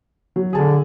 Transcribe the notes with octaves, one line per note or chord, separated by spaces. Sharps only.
F#3
D3 G#4 A5